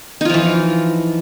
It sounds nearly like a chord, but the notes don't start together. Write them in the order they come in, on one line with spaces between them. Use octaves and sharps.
D#4 F4 F3 E3